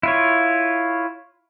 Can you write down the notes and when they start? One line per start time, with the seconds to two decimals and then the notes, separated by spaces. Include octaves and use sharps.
0.03 E4 F4 C#5